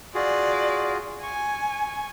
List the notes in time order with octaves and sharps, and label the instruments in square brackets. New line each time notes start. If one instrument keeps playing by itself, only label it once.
[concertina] F4 F#4 G#4 [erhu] D5
[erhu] G#5 [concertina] C#6